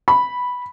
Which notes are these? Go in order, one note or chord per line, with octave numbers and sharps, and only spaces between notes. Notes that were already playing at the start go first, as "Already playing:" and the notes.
B5